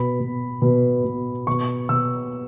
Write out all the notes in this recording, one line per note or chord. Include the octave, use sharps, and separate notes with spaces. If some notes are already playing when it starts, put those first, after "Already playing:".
Already playing: B2 B5
B2
B2
B2
B2 C#6
B2 E6